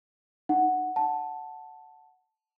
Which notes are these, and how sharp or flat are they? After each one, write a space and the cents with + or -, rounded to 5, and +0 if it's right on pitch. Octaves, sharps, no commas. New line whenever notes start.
D#4 -30 F#5 +0
F#5 +0 A5 +0